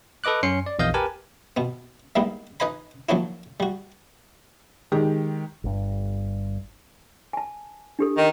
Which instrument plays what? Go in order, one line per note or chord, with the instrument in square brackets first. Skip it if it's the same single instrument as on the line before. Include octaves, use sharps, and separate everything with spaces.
[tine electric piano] A4 B4 D#5 D6 F#6
F#2 C#4 C6 C7 C#7
D5
A#1 E2 D#5 F5 D#6 G6
G4 A#4 B4 G#5 A5
[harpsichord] B2 B3
G3 G#3 A#3 B3 D#4 E4
D#4 B4 D#5 G#5 B5
F3 F#3 A#3 C#4 D#4 E4
G3 F#4
[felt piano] D#3 G#3 G4
[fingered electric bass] G1 G2
[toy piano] G#5 A5
D4 G4 A4
[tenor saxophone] D#3